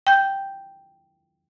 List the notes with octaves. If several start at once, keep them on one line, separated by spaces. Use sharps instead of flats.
G5 G6